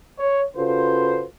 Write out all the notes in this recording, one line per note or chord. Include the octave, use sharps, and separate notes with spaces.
C#5
C#3 F4 F#4 A4 B4 C5